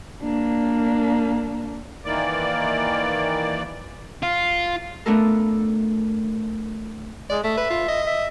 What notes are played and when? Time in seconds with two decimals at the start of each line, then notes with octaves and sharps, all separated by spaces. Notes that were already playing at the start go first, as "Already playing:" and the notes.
0.23 A#3 D4
2.05 D#3 E3 A#3 D5
4.23 F4
5.06 A3 B3 D4 F4 A4 A#4
7.30 G#3 D5
7.44 A3 E5
7.58 B4
7.70 F4
7.88 D#5
8.06 E5